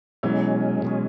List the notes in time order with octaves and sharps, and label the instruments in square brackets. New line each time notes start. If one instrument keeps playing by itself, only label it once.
[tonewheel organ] B2 G#3 C#4 [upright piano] E3 F#3
[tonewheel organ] B2 G#3 C#4